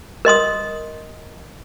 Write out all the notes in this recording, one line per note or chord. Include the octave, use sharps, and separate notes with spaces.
A#4 D#5 C6 D#6